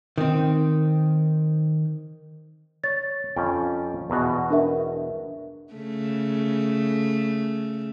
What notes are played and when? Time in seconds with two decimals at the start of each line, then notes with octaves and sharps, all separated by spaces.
0.18 D#3 C4
2.84 C#5 A6
3.36 F2 C#4 G5
4.10 E2 B2 F#4
4.50 D4 A#4 E5
5.73 C#3 A3